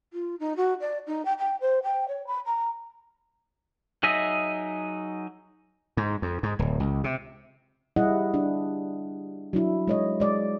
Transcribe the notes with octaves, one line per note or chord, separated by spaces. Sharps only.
F4
D#4
F#4
D5
D#4
G5
G5
C5
G5
C#5
B5
A#5
F#3 D#4 G#4 D#5 E5
G#2
F2
G#2
D1
C#2
C3
G3 E4 G#4 D#5 F#5
D4
F#3 D4 E4
G#3 C#5 D#5
G#3 D5